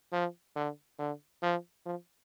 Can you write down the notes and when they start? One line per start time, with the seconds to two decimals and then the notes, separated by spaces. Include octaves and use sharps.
0.13 F3
0.56 D3
0.98 D3
1.42 F3
1.86 F3